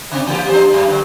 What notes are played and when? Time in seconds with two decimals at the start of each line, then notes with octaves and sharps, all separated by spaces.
0.11 C#3 C4 D4
0.27 E3 A#3 G4
0.49 D4 C5
0.73 F#2
0.89 G2 D3